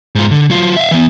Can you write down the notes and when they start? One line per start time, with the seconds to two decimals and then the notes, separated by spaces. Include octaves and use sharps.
0.15 G#2 F4
0.31 D3
0.50 F#3 F4
0.76 E5 F5
0.91 E3 B3